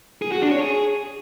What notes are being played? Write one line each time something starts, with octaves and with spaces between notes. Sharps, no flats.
G#4
F#4
D4
C#5
G#4